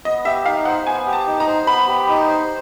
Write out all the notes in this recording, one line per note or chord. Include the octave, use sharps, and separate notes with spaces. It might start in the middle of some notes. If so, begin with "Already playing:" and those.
B3 D#5
G4 E5
D#4 F5
C5 F#5
B3 G#5
G4
A5
D#4
A#5
C5
B3 B5
G4
D#4
C5